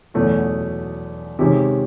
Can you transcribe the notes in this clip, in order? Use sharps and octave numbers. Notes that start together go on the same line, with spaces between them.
E2 B2 F#3 A3 C#4
C3 D#3 G#3 C#4 G4